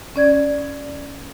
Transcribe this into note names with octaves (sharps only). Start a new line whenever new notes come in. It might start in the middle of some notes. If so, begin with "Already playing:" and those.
C#4 D5 G#6